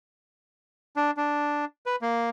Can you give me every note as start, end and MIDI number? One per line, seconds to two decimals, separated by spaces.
0.96 1.11 62
1.17 1.65 62
1.86 1.96 71
2.02 2.30 58